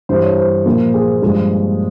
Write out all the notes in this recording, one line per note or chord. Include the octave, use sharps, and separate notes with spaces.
G2 E3 G3 C5
C#5
C5
A#2 F3 A#3
G#4
G2 F3 G#3